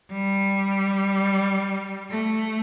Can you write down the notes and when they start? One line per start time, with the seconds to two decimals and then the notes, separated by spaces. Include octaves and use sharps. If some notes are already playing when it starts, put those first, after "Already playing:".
0.12 G3
2.10 A3